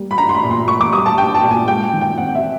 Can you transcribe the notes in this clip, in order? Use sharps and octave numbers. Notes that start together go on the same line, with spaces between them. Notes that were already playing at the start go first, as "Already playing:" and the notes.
Already playing: G3 A#3
B5
D4 A#5
C6
B5
A#2
C6
A#3 C#6
D6
G3 D#6
A5
D4 G5
A5
A#2
G#5
G#3 G5
D#3
G5
C4 F#5
E5